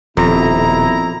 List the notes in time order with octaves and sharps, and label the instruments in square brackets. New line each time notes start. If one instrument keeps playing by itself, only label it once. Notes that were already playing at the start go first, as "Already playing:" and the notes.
[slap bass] D#1 [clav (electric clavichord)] F2 [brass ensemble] B2 C4 E4 [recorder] A#5